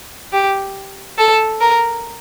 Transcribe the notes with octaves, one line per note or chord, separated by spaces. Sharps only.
G4
A4
A#4